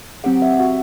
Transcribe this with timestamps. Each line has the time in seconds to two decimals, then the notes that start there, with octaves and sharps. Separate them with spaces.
0.24 F#3 C4 G4 F#5
0.42 E5
0.59 F#4